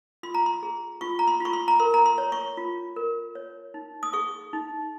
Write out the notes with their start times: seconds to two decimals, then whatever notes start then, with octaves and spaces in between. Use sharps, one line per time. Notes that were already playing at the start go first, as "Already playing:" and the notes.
0.23 F4 C6
0.34 A#5
0.46 C6
0.63 G#4
1.01 F4 C#6
1.19 A#5
1.28 C6
1.40 F4 C#6
1.53 C6
1.68 A#5
1.80 A#4 C6
1.94 A#5
2.06 C6
2.18 C#5
2.32 C#6
2.57 F4
2.96 A#4
3.35 C#5
3.74 D#4
4.03 D#6
4.13 G#4 C#6
4.53 D#4